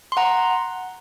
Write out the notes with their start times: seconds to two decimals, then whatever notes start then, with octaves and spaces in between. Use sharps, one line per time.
0.12 C6
0.17 F#5 A#5